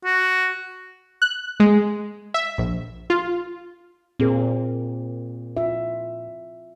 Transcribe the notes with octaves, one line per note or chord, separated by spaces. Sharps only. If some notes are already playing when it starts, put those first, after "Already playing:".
F#4
F#6
G#3
E5
A#1
F4
A#2 C4 G#4 A#4
F4 E5